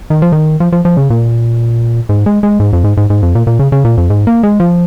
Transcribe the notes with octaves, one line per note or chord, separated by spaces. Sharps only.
D#3
F3
D#3
F3
F3
F3
C#3
A#2
G#2
G#3
G#3
G#2
F2
G#2
G#2
G#2
F2
A#2
A#2
C#3
C#3
A#2
F2
G#2
A#3
G#3
F3